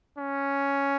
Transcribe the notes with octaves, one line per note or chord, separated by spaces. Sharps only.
C#4